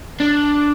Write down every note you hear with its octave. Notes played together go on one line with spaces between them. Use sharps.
D4